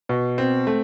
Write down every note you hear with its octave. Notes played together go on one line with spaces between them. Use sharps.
B2
C4
A3